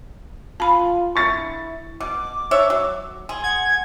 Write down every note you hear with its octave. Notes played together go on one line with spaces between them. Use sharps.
F4 A5 B5
E4 C#6 A6 C#7
B2 D6
D4 C#5 E5
F#3
G#4 C6
F#5 G#6